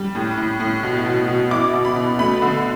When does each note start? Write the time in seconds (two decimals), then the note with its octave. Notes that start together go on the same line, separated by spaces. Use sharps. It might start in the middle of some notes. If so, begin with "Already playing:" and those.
Already playing: G3
0.15 A2
0.37 A2
0.60 A2
0.83 B2
1.06 B2
1.28 B2
1.51 E4 D6
1.73 B2
1.85 B5
1.96 B2
2.19 A3 B5
2.42 D3